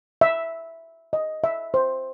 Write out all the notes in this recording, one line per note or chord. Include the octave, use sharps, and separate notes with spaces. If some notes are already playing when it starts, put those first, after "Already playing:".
E5
D#5
E5
C5